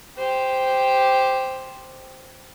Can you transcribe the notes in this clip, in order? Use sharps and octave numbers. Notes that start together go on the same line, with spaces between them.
G4 C5